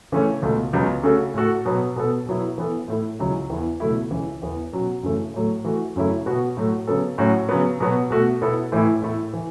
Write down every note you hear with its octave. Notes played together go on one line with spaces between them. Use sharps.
C#3 E3 A3 C#4
C#2 B2 A3
C#2 C#3 F#3 B3
C#3 A3 F#4 A4
A2 A3 F#4 A4
B2 F#3 B3
B2 B3 A4
B2 F#3 B3 E4
E3 B3 A4
A2 A3 E4
C#2 C#3 F#3 C#4 E4
E2 E3 B3 E4
C#2 B2 F#3 A3 E4
C#2 C#3 E3
E2 E3 B3
B2 F#3 C#4 F#4
F#2 C#3 E3 A3
A2 F#3 A3
E3 A3 F#4
F#2 C#3 F#3 A3 E4
B2 B3 F#4
A2 F#3 A3 F#4
C#3 F#3 B3 A4
A2 F#3 C#4 F#4
C#3 F#3 B3
B2 F#3 B3 F#4
B2 A3 F#4
B2 B3 E4 A4
A2 E3 A3 E4
A2 A3 E4 A4
E3